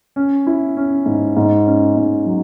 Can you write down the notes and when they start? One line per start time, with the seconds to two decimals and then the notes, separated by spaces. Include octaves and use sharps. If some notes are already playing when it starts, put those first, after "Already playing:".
0.16 C#4
0.47 E4
0.77 C#4
1.06 G#2
1.37 G#2
1.66 C#4
1.97 G#2
2.26 F#3